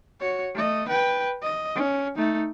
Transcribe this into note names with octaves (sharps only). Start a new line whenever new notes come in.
F#4 C#5
A3 D#5
B4 G5
D#5
C#4
A3 D#4